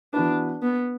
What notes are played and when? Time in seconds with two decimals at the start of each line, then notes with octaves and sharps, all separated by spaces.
0.14 E3 B3 D4 F#4 B4
0.63 B3